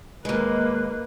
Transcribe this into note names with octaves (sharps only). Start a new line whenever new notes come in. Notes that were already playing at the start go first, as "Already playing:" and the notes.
D#2 G#3 A#3 B4